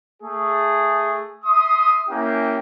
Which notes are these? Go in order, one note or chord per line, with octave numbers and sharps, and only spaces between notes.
A3 G#4
E5 C6 D#6
A#3 C#4 E4 G4 G5